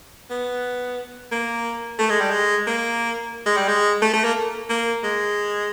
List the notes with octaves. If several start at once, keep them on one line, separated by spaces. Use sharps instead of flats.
B3
A#3
A3
G#3
G3
G#3
A#3
G#3
G3
G#3
A3
A3
A#3
A#3
G#3